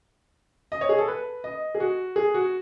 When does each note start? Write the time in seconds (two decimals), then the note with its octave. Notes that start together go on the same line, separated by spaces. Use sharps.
0.72 D#5
0.81 C#5
0.89 G#4
0.98 A4
1.08 B4
1.44 D#5
1.75 G#4
1.80 F#4
2.16 G#4
2.34 F#4